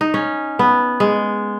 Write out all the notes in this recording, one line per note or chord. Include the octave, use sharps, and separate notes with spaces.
D#4
C#4
B3
G#3